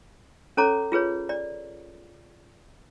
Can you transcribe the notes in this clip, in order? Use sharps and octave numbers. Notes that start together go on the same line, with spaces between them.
C#4 A4 C#5 A#5 D6
F4 G#4 B4 C#5
D5